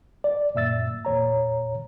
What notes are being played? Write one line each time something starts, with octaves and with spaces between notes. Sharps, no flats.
D5
F#2 A#2 E5 E6 A6
E2 A#2 C#5 A#5